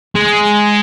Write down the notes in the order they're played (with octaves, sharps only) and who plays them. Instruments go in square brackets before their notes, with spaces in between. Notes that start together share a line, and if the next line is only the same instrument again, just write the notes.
[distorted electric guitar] G#3